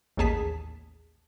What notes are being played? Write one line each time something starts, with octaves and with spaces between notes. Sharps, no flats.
A1 D#2 G#4 A5 B6